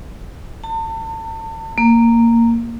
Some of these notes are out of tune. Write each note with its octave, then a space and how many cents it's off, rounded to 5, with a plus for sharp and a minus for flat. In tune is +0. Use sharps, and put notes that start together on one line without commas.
A5 +35
A#3 -10